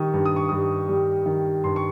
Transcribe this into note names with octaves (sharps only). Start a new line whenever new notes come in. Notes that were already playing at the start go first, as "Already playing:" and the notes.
Already playing: D#3 G3 C#6 D#6
G2
D#6
C#6
G2 D#6
G3
D#3
G2 C6
C#6